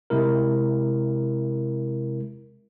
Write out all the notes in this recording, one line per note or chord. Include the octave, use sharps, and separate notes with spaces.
C3 G#3 E4 A#4